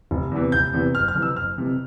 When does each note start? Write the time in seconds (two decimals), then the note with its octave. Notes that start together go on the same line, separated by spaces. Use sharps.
0.11 F1
0.31 E2 C3 E3
0.52 F1 G6
0.73 E2 C3 E3
0.95 F#1 F6
1.08 F6
1.15 F2 C3 E3
1.22 E6
1.36 F#1 F6
1.58 F2 C3 E3